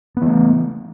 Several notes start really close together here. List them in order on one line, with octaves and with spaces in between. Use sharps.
B3 E3 A3